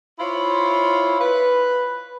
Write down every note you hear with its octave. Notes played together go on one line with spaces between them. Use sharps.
E4 F4 C5 C#5
B4